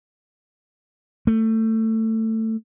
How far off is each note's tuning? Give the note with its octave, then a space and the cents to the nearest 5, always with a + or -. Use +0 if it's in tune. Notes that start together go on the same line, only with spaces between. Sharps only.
A3 +20